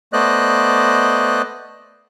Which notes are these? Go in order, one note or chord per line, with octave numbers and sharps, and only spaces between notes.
A3 B3 C5 D5 D#5 F#6